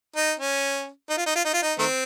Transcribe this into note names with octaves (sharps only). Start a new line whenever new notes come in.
D#4
C#4
D#4
F4
D#4
F4
D#4
F4
D#4
D#3 A3 C4